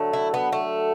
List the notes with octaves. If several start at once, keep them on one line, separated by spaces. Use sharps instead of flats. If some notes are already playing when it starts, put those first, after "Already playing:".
Already playing: D3 F#3 A3
E4
B3
A3